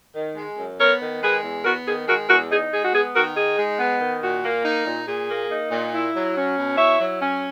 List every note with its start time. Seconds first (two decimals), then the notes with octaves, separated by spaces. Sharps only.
0.15 D#3
0.36 G#3
0.58 F#2
0.79 B3 A#4 C#5
1.01 D#3
1.21 G#3 G#4 B4
1.43 E2
1.64 B3 F#4 A#4
1.86 D#3 G#4
2.07 G#3 F#4 A#4
2.28 E2 F#4 A#4
2.50 D#4 G#4
2.72 G#3 G#4
2.84 F#4
2.92 B3 G#4
3.14 D#3 F#4 A#4
3.35 D#4 G#4
3.57 G#3
3.79 B3
4.00 D#3
4.22 A#2 F#4
4.44 A#3
4.64 D#4
4.86 A#2
5.07 A#2 G#4
5.29 A#3
5.50 D#4
5.71 A#2
5.93 E4
6.15 F#3
6.36 C#4
6.57 B2
6.78 E4 C#5 E5
6.99 F#3
7.21 C#4